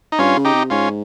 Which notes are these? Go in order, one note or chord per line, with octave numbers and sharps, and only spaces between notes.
D#4
G2 C#4 F4
C#3
D#4 G4
C3
G#2 C#4 F4